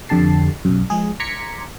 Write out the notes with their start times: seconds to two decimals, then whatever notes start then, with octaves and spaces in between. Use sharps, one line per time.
0.09 F2 D3 G4 A5 C7
0.65 B1 F#2
0.90 F3 G#3 G#4
1.20 A#5 C6 D6 G#6 B6 C#7